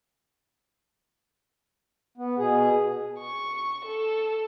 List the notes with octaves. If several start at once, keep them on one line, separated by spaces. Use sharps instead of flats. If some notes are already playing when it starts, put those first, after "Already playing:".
B3
B2 G#4
C#6
A4